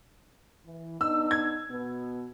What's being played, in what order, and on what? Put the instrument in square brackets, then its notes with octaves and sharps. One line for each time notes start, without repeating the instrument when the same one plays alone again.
[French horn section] E3
[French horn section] B3 D4 D#4 [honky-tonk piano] E6
[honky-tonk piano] G#6
[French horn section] B2 B3